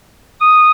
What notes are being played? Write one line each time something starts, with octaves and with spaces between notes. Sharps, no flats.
D#6